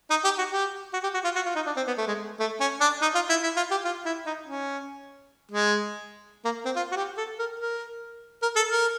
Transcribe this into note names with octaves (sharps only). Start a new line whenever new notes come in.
D#4
G4
F#4
G4
F#4
G4
F#4
F4
F#4
F4
D#4
D4
C4
B3
A3
G#3
A3
C#4
D4
D#4
F4
E4
E4
F4
G4
F4
E4
D#4
C#4
G#3
A#3
C4
F4
F#4
G4
A4
A#4
A#4
A#4
A4
A#4